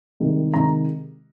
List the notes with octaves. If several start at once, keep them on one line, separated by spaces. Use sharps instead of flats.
C2 C3 D#3 G#3
C3 D#3 G#3 A#5